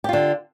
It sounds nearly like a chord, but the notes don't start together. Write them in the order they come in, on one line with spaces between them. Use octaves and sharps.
G4 F4 D3